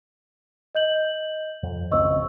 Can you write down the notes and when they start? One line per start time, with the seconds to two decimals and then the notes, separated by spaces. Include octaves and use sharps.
0.75 D#5 G6 F#7
1.63 F2
1.91 G#1 C#2 C4 D#5 C#6 E6